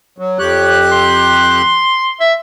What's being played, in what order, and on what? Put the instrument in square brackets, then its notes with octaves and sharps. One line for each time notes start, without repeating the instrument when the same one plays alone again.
[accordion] F#3
[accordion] F2 G4 F#6 [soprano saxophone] C#5
[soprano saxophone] C6
E5